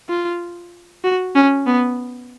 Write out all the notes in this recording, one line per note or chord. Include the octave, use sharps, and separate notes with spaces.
F4
F#4
C#4
B3